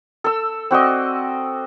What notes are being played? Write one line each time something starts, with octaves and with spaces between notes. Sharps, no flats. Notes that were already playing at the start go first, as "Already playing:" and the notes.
A4 E6
C4 F#4 D5 D#5